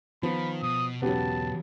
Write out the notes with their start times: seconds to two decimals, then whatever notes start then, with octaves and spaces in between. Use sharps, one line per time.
0.23 D#3 F3 B3 B5
0.62 B2 D#6
1.02 B1 E2 C#3 F#3 B3 G4 A5